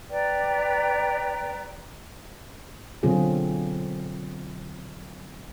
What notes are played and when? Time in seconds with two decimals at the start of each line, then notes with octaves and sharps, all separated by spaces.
0.10 B4 D5 G5 A#5
3.03 B2 D3 F#3 C4 F4 G#4